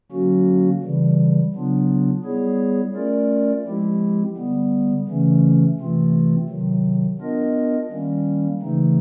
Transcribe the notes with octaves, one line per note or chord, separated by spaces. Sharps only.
D3 F#3 A#3 C#4 F#4
C#3 E3 G3
C#3 F#3 B3 D4 F4
G3 B3 E4 G#4 C#5
A3 C#4 F4 A#4 D5
F3 G#3 C4 E4 G4
D3 G3 B3
C#3 E3 A3 C#4
C3 E3 A3 C4 F4
C3 D#3 F#3
B3 D4 F4 A#4 D#5
D#3 G3 A#3 C#4
C#3 E3 A3 C4 D#4